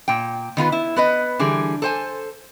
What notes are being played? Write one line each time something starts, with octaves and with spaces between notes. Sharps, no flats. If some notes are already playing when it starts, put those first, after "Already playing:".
A#2 G5
D#3 B3 F4 B4
E4
B3 B4 D#5
D3 E3 G3 G#4
A4 C5 G#5